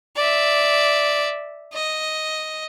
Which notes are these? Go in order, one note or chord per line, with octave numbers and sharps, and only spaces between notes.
D5 E5
D#5